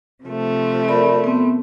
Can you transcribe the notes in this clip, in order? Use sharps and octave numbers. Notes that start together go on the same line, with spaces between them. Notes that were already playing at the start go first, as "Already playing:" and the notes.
C3 F3 A3
A#4 D5 B5
B3 C4